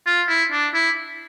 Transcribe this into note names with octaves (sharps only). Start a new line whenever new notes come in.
F4
E4
D4
E4